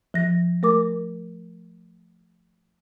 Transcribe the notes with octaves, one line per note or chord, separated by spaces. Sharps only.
F3 A#6
A3 A#4 D6